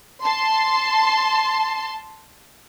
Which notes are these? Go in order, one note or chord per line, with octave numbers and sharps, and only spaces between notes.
A5 C6